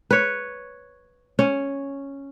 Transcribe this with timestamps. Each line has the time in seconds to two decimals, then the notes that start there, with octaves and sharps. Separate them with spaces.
0.11 B4 C#5
1.39 C#4